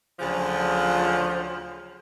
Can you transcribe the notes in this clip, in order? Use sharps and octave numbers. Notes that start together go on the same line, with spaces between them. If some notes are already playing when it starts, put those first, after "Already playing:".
D2 C#3 F3 F#3 F4